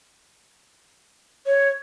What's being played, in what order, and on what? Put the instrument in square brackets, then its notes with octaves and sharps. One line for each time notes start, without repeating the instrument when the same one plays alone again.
[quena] C#5